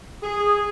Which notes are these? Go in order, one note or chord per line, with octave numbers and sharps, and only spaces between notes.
G#4